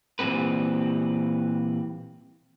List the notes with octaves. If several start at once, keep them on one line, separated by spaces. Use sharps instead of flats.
A#2 E3 F#3 G3 C4 B4